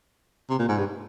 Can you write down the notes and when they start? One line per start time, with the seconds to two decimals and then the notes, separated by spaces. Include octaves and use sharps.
0.50 C3
0.59 A#2
0.69 G#2
0.78 G2